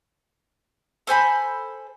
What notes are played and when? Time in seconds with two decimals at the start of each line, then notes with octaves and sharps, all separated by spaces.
1.07 A4 C5 G#5 B5